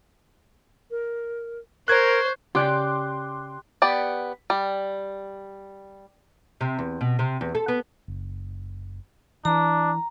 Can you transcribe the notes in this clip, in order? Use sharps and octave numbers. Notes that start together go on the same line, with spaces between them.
A#4
A#4 C5 C#6 F#6 G#6
C#3 G4 D5 G5 C6 D6 F#6
B3 G4 D5
G3
C3
E2
B2
C3
E2
A4
B3
F#1
E3 D4 A#5